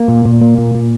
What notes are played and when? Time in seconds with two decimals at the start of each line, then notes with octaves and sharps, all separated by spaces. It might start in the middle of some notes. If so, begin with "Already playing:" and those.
Already playing: A#3
0.08 A#2
0.25 A#2
0.41 A#3
0.58 A#2
0.75 A#2